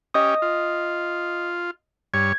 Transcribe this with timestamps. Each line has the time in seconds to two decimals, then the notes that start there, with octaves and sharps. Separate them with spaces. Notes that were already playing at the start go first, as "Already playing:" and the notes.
0.14 C#4 G4 D#5 D#6
0.42 F4
2.14 G2 C#5 G#6